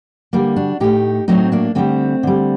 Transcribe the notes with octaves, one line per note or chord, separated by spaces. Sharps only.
D3 G3 A#3
D4 F#4
A2 A3 D#4 G4
A2 F#3 A3 C4 D#4
A#3 D4
D3 G3 A3 C4
D3 G3